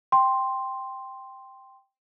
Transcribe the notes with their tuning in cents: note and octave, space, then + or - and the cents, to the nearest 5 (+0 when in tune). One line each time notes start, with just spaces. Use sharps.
G5 +5 C6 +0